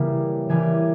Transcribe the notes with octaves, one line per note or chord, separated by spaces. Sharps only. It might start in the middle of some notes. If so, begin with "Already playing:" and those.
Already playing: C#3 E3 G3 A#3
C#3 E3 G3 A#3 G#5